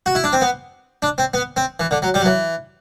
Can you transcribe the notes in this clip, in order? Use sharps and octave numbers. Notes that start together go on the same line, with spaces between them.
F#4
E4
D4
C4
B3
D4
C4
B3
C4
E3
D3
F#3
G3
F#3
E3